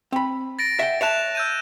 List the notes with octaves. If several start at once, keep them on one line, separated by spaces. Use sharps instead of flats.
C4 B5
A6 A#6 D7
E5 F#5 G5
C#5 E5 A5 F#6 E7 F7
E6 G6 D#7